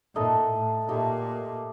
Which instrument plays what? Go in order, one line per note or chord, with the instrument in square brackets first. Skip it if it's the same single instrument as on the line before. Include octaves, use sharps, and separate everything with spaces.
[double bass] A#2 [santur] A3 D#4 A4 D#5
[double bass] A2
[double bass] A#2 [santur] A3 D#4 G4